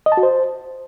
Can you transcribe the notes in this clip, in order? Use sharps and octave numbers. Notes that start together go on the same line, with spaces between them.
D#5
A5
F#4
C5